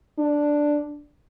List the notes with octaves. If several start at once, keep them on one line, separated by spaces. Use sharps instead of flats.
D4